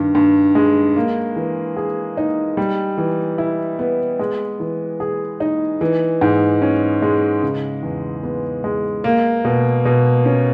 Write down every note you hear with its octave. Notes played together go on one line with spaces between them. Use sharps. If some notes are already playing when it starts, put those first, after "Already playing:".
Already playing: G2 D#3
G2
G#3
A#3
E3
G#4
D#4
G3
E3
E4
B3
G#3
E3
G#4
D#4
E3
G#2
C#4
G#3
C#3
E2
B3
G#3
A#3
B2
B2
C#4